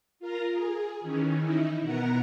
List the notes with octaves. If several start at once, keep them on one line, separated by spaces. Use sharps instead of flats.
F4 A#4 A#5
G#4
D#3 E3 C#4
D#4 E4
B2 B3 A#4 F#5 A#5